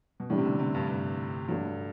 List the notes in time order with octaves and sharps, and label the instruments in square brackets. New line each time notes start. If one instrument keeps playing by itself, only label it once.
[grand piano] B2
[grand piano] A2 [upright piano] E3 G3 D4
[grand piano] C3
D3
C3
G2
G2
[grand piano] G2 [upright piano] F#3 A3 D4